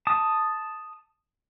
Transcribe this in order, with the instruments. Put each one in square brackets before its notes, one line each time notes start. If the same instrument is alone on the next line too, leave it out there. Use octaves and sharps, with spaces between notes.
[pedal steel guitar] A5 D#6